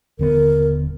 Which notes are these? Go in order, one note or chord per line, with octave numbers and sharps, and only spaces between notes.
D#1 D3 B3 A#4